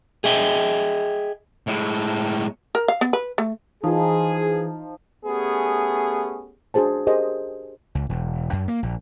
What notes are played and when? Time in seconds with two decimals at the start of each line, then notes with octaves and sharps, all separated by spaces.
0.24 G#4 D#5 E5 G5
1.67 A2 G#3
2.75 A#4
2.88 F5
3.01 B3
3.13 B4
3.38 A3
3.84 E3 F3 D#4 F4 G#4 C5
5.25 A3 B3 C#4 G4 G#4
6.74 D4 F#4 G#4 C5 A5
7.07 G4 G#4 A#4 C5 D#5
7.95 C#2
8.10 E1
8.53 F#2
8.68 A#3
8.83 A#1